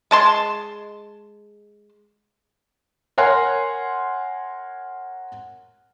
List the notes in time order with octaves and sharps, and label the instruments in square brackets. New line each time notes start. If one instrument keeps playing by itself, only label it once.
[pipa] G#3 A5 C6
[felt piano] A#4 C#5 F#5 G#5 C6